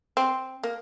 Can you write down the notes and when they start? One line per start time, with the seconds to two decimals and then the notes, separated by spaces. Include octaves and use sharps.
0.17 C4
0.63 A#3